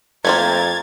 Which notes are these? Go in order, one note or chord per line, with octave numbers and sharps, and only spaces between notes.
F2 A3 A#3 C4 A#5 G#6 A6